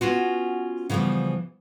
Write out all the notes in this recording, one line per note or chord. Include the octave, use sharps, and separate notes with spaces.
B3 C#4 F4 F#4
C#3 E3 F3 G3 B3